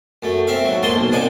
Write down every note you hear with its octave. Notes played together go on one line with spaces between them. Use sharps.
F#2 A3
C4 E5 F5
G#2 F#3
F2 G#2 A#3 D#5 A5 C6
B1
C2 G#2 D4 D#4 D5 G#5